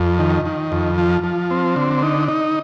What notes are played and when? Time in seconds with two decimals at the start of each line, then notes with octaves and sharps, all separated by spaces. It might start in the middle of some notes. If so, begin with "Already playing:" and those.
Already playing: F2
0.19 D#3
0.45 D#3
0.72 F2
0.98 F3
1.24 F3
1.51 C4
1.76 D3
2.02 D#4
2.28 D#4